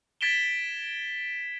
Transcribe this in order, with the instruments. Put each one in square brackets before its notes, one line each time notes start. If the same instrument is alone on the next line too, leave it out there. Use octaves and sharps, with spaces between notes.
[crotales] G#6 A6 B6 D7 E7 G7